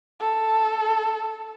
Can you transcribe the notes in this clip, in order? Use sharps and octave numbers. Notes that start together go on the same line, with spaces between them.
A4